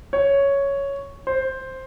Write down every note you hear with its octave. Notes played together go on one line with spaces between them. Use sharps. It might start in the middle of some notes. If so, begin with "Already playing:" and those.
C#5
C5